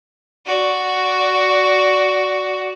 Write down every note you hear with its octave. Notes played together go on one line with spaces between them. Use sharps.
F#4 D5